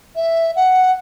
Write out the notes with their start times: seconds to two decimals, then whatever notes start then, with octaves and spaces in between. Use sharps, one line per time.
0.16 E5
0.56 F#5